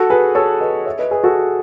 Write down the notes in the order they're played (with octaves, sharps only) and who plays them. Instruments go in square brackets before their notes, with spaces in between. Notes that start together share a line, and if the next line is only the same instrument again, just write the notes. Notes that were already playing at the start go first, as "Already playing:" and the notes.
Already playing: [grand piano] F#4 A4
G#4 B4
A4 C#5
B4 D#5
C#5 E5
B4 D#5
G#4 B4
F#4 A4